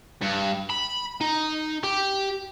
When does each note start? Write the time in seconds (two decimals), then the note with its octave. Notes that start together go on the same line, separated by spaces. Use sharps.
0.21 G2
0.70 B5
1.21 D#4
1.84 G4